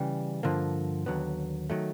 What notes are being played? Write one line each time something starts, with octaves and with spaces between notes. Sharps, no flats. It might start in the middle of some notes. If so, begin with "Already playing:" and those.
Already playing: C#3 E3 G3
G2 D3 F3 A#3
D#2 D3 F#3 B3
D#3 F#3 A3